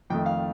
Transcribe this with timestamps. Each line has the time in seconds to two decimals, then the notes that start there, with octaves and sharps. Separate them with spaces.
0.10 F2 D#3 A3 G5
0.26 F5